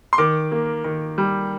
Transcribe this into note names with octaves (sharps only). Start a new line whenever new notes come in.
C6
D#3 D6
A#3
D#3
G3